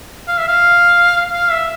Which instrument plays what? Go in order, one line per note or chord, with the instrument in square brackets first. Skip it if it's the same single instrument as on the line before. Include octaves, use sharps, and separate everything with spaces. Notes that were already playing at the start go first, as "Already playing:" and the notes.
[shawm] F5
E5
F5
F5
E5